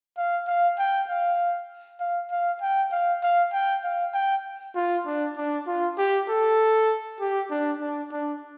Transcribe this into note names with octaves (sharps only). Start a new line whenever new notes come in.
F5
F5
G5
F5
F5
F5
G5
F5
F5
G5
F5
G5
F4
D4
D4
F4
G4
A4
G4
D4
D4
D4